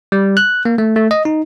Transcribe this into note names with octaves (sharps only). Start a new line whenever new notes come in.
G3
F#6
A#3
A3
A3
D#5
D#4